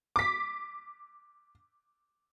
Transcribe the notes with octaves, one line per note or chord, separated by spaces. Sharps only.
D6 B6